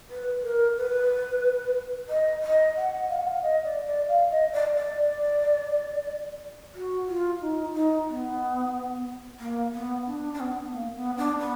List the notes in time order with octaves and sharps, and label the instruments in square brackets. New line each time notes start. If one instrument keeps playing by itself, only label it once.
[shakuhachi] B4
A#4
B4
D#5
D#5
F#5
F5
F#5
F5
D#5
D5
D5
F5
D#5
D5
D5
F#4
F4
D#4
D#4
B3
A#3
B3
D4
D4
B3
A#3
B3
D4
B3